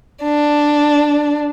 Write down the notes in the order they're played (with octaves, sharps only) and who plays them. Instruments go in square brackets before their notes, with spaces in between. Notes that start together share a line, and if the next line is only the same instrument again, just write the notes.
[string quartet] D4